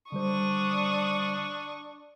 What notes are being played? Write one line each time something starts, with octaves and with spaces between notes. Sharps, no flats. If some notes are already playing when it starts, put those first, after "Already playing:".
D3 G3 D4 C5 C#6 D#6